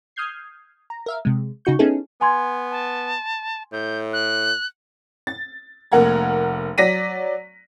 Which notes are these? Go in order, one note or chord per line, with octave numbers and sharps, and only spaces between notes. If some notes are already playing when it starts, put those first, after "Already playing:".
D#6 F6 G6 G#6 C7
A#5
A#4 E5 F5
C3 G#3
C#3 D#4 F#4 C#6 G6
B3 C#4 D#4 E4 G#4 A4
B3 G#5 C6 G#6
A5
A2 G6
F#6
A6
F1 A#3 A#4 F#5 A#5 G#6
F#3 D5 A#6 B6 D#7